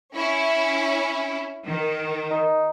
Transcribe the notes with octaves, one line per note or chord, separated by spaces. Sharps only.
C#4 E4
D#3
D#4